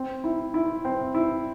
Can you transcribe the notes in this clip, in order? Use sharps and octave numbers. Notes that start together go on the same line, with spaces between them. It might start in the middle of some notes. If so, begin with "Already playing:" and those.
Already playing: C4
E4
E4
C4
E4